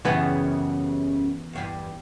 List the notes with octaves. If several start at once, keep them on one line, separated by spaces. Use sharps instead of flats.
F#2 C#3 E3 G3 B3
E2 G2 G3